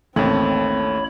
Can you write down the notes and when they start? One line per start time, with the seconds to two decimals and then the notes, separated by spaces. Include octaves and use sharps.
0.16 A1 D#2 A3 C4 C#5 B5